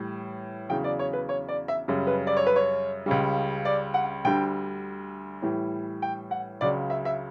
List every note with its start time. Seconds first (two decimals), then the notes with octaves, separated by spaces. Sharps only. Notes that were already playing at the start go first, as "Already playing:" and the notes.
Already playing: A2 E3 G3
0.69 E2 C#3 F#3 G5
0.84 D5
0.99 C#5
1.13 B4
1.29 C#5
1.48 D5
1.68 E5
1.88 F#2 C#3 G3
2.07 B4
2.27 D5
2.37 C#5
2.47 B4
2.56 C#5
3.06 C#2 C#3 G3
3.65 D5
3.94 F#5
4.25 D2 D3 G3 G5
5.42 A2 E3 G3
6.02 G5
6.31 F#5
6.61 C#2 C#3 F#3 D5
6.90 E5
7.05 E5